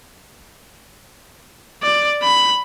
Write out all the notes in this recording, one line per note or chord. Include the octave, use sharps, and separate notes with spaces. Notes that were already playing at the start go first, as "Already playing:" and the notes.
D5
B5